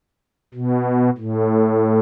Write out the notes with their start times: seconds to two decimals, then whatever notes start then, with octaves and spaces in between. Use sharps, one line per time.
0.54 B2
1.17 A2